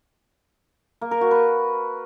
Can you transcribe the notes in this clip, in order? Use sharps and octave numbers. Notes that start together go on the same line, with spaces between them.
A#3
A#4
F#4
B4